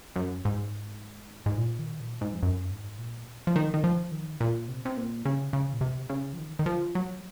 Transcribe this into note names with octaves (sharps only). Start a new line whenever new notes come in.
F#2
G#2
G#2
A#2
D#3
A#2
G#2
F2
F#2
G#2
A#2
F3
D#3
D#3
F3
D#3
A#2
C3
C3
A#2
C#3
C#3
A#2
C3
C#3
F3
D#3
D#3
F3
F#3